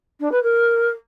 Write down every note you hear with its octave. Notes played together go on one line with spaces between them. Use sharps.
D4
B4
A#4